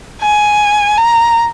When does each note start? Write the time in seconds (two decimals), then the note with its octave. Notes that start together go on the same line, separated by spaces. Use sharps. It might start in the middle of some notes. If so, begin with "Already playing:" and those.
0.22 G#5
0.98 A#5